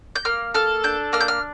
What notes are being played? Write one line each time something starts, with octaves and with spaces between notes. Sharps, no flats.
G6
A#3 F6
A4 F6
D4 G6
A#3 F6
G6
F6